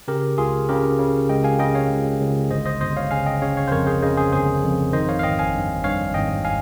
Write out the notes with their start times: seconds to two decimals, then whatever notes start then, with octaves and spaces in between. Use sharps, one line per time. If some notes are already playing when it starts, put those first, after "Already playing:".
0.08 C#3 G4 A#4
0.38 C#2 F4 G#4
0.69 C#3 G4 A#4
0.99 C#3
1.29 C#2 D#5 G5
1.44 F5 G#5
1.59 C#3 D#5 G5
1.75 C#5 F5
1.90 C#2
2.20 C#2
2.50 G1 C5 D#5
2.66 C5 D#5
2.81 G1 C5 D#5
2.97 C#5 F5
3.11 C#3 F5 G#5
3.26 D#5 G5
3.42 C#3 C#5 F5
3.57 C#5 F5
3.68 C5
3.71 F2 A#4 C#5
3.87 G#4 C5
4.02 C#3 C5 D#5
4.17 G#4 C5
4.32 G1 G#4 C5
4.63 F2
4.93 D#3 C5 D#5
5.09 C#5 F5
5.19 F5
5.23 G#1 D#5 G5
5.39 F5 G#5
5.54 G2
5.84 G2 C#5 F5
6.14 G#1 D#5 G5
6.45 F5 G#5